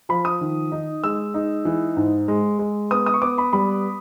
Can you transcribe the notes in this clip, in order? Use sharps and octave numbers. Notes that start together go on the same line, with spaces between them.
F3 B5
D#6
D#3
D#4
G#3 E6
D#4
E3
G#2
G#3
G#3
B3 D#6
D#6
C#6
B3 D6
B5
G3 B5